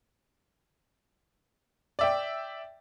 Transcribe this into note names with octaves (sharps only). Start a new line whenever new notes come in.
D5 E5 G5